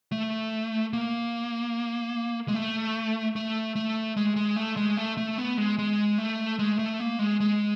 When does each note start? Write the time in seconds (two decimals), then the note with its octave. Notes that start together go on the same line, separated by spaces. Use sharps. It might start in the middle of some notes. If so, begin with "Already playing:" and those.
0.12 A3
0.93 A#3
2.48 G#3
2.54 A3
3.36 A3
3.76 A3
4.17 G#3
4.36 G#3
4.56 A3
4.77 G#3
4.97 A3
5.17 A3
5.38 B3
5.57 G#3
5.79 G#3
6.18 A3
6.59 G#3
6.79 A3
7.00 A#3
7.19 G#3
7.40 G#3